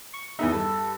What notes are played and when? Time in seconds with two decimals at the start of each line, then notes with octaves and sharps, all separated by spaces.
0.13 C#6
0.39 E2 B3 D#4 E5
0.52 G2 A4